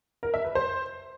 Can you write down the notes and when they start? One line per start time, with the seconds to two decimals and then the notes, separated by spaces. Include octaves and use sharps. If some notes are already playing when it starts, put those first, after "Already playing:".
0.23 A#4
0.34 E5
0.45 B4
0.55 C5